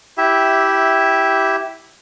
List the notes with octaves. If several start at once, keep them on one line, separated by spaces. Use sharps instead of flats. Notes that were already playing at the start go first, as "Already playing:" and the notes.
E4 G4 E5